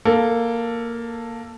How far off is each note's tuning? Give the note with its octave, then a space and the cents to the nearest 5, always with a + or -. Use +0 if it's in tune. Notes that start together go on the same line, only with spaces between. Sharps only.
A#3 +0 A4 +15